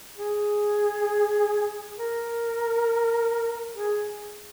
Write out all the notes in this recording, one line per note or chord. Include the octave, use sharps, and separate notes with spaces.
G#4
A#4
G#4